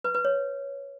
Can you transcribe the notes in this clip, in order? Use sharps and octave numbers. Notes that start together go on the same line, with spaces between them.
B4
B4
C#5